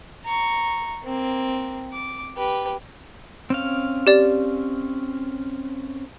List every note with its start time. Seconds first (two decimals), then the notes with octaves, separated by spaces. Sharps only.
0.25 A#5 C#6
1.04 A#3 C4
1.93 D6
2.36 G4 B4
3.50 C4 C#4 F5
4.07 G4 D5